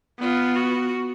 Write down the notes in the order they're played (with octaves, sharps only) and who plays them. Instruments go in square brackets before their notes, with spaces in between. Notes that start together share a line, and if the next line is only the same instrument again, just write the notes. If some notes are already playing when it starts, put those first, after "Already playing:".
[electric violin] B3 [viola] F4
[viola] F#4